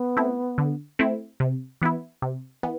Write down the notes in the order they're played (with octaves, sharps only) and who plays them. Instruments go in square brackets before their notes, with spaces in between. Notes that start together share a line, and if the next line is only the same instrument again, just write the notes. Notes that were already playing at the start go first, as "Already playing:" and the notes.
Already playing: [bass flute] B3
[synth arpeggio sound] A3 C4 E4
D3
A3 C4 E4
C3
E3 B3 E4
C3
E3 B3